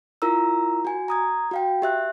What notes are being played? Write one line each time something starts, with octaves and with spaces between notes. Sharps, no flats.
E4 F4 A#4 A#5 E6
F#4 G#5
A#5 D#6 G#6
F#4 F5 G5
G4 E5 F#6